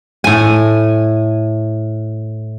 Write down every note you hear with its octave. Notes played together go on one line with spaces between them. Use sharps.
A2 G#5